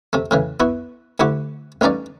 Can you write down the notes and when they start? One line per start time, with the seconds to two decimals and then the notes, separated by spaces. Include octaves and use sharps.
0.13 C3 A3
0.31 A2 C#3 E3
0.60 B3 E4 F#4
1.20 D2 E4 F#4 G4 F#5
1.81 A1 G2 C#4 D#4 D5